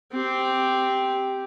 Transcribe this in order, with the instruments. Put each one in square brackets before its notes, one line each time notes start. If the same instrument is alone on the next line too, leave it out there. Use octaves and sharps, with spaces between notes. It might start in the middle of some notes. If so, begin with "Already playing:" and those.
[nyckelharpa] C4 G4